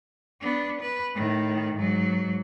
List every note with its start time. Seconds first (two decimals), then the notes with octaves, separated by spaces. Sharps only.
0.41 B3 D4
0.81 B4
1.15 A2 D#3
1.76 G#2 F#3